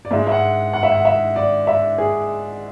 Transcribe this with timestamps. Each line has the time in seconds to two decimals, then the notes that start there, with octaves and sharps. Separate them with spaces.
0.05 D5
0.11 G#2 G#3 E5
0.27 E5
0.32 F#5
0.73 F#5
0.83 E5
0.92 F#5
1.05 E5
1.36 D5
1.67 E5
1.98 G#4